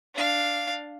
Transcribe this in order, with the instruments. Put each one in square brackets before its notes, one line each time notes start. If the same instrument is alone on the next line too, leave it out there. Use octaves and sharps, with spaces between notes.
[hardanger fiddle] D4 F5